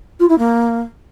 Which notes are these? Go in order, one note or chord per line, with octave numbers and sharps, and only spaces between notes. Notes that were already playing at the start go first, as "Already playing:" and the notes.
F4
E4
A#3